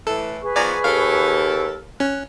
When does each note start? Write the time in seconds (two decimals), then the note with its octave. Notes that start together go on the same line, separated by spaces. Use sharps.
0.07 A2 E3 A4
0.42 G#4 B4 C#6
0.56 D#3 F3 B3 D5 G#5 A#5
0.84 D#2 A4 A#4 F5
2.00 C#4 F#6